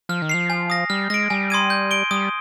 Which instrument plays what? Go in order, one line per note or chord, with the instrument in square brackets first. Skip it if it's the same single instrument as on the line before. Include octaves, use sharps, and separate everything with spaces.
[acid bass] F3 [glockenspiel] F6
[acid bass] D#3
[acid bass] F3 [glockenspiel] C7 F7
[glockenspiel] G#5
D#6 A#6
[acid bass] G3 [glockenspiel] F6
[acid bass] G#3 [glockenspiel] A#6 D7
[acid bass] G3 [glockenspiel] G#5
[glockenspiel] C6 D#6 G#6 D#7
G6
D7 G7
[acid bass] G3 [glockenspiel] D#6